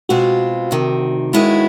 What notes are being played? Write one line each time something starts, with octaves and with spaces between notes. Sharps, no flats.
B2 G#3 C4 F4 F#4
D2 C3 D#3
D#2 D#3 G#3 B3 E4